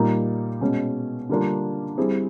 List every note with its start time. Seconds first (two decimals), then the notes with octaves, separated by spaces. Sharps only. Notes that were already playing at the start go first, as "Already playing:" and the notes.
Already playing: A#2 G3 A#3 D#4
0.61 B2 G#3 C#4
1.29 D3 G3 A#3 D4 F4
1.98 G3 C4 E4 G#4